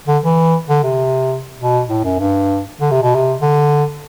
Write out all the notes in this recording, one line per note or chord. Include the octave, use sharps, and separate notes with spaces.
D3
E3
D3
C3
B2
A2
F#2
G2
D3
C3
B2
C3
D3